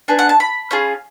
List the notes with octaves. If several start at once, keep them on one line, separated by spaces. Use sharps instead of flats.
B3 D4 G#4
F#5
A5
B5
C#4 F4 G#4